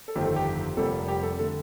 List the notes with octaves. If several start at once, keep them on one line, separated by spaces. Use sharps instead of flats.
A4
G1 F2 D#3 A3 C4 G4
A4
G4
F1 F2 C3 G3 A#3 A4
G4
A4
D3 A3 A4